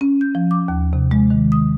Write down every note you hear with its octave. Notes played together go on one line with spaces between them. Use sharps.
C#4
G6
F3
D6
D#2
C3
G#3
D#3
D#6